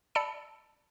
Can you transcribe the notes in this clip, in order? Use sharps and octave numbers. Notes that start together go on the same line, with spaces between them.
D5 A5 B5 E6 C#7 D7